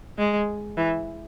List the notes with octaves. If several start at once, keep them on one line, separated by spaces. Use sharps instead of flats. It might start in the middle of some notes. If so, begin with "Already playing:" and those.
G#3
E3